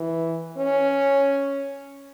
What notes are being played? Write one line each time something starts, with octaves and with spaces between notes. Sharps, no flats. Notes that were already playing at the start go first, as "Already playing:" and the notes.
Already playing: E3
C#4